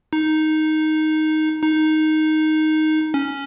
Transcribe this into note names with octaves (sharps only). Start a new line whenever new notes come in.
D#4
D#4
C#4